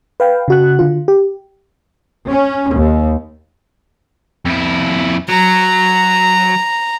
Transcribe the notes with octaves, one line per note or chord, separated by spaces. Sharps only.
B4 F5 G5
C#3 F#4 F#6
D3 F4
G4
C#4
D#2
F2 E4
F#3 A#5